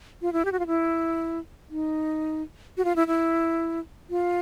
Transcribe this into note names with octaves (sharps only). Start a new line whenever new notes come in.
F4
E4
G4
F#4
F4
E4
D#4
F#4
F4
E4
E4
F4